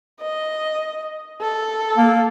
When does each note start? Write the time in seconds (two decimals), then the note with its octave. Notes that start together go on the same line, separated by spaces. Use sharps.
0.21 D#5
1.41 A4
1.97 A#3